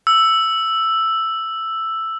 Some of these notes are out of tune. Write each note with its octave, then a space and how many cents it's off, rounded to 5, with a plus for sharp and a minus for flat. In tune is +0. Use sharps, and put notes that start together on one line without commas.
E6 +5